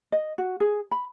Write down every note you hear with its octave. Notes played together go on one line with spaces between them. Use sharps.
D#5
F#4
G#4
B5